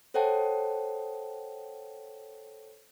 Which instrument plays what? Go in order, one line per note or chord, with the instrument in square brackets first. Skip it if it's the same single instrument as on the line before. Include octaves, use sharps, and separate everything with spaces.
[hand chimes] A4 C5 C#5 F#5 G5 A5